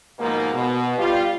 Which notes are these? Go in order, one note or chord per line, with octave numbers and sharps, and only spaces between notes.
D#2 G#2 B2 F3 G#3 A#3
B2
G3 F4